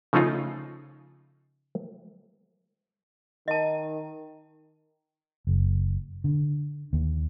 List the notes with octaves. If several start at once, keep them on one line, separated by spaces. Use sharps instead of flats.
C#3 F3 A3 C#4 D#4 F4
D#3 D#5 A5
F#1
D3
D#2